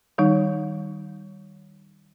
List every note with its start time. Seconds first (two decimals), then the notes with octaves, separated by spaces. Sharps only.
0.18 D#3 G3 D#4